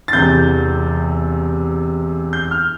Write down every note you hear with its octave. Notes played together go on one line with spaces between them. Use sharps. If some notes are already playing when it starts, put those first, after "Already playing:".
A6
E1 E2 C3 G6
G6
F6